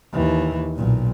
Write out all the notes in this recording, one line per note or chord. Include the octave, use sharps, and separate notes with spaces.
D#2 E3
B1 A#2